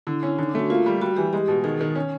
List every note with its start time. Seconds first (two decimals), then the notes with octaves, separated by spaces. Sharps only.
0.07 D3 E4
0.23 C#4
0.39 D3 D#4
0.49 D4
0.55 A3 F#4
0.70 A#3 F4
0.86 G3
1.01 G3 F#4
1.17 E3 G4
1.33 G#3 G4
1.48 B2
1.64 D#3 G#4
1.81 D#3
1.95 C#4